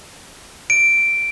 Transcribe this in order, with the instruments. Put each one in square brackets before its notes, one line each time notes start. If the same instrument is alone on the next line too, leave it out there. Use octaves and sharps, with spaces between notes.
[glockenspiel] D7